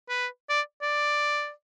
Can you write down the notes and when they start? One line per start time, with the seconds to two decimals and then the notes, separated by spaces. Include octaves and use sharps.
0.09 B4
0.49 D5
0.82 D5